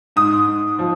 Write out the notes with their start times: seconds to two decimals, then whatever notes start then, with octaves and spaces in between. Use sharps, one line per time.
0.16 G#2 D#6
0.47 G#2
0.79 F3